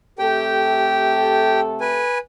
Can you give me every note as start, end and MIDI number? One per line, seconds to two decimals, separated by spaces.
0.19 2.06 48
0.19 2.06 57
0.19 1.60 67
0.19 2.06 69
0.19 1.60 79
1.81 2.18 71
1.81 2.18 80